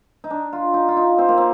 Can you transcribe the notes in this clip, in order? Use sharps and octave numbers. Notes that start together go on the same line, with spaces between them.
D#4
D4
F4
D#4
F4
D#4
C4
A#3
C4